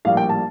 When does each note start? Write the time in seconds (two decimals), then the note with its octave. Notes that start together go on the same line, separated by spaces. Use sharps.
0.05 A#1 A2 G3 A#3 F5
0.17 G5
0.29 A5